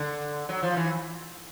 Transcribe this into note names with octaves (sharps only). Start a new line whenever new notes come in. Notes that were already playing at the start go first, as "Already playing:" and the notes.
Already playing: D3
F#3
F3
E3